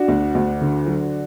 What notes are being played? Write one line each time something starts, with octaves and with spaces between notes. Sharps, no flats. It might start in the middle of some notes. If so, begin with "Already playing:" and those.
Already playing: D4 F#4
D2
D2
D3
F#3